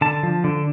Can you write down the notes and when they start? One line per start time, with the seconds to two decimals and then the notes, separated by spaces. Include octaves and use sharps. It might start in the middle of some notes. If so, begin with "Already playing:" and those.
0.01 D3 A5
0.23 F3
0.44 D3